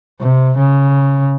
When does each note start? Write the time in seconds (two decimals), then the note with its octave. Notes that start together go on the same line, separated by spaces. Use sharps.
0.21 C3
0.58 C#3